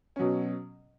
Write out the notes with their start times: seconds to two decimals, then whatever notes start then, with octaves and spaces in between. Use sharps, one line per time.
0.16 B2 F#3 C#4